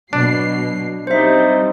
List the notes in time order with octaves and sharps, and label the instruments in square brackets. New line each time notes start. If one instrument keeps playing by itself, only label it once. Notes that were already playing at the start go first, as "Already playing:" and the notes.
[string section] B2 F#3 C7 [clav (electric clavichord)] D4
[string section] F#3 G3 C4 [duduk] D#4 [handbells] C5 E5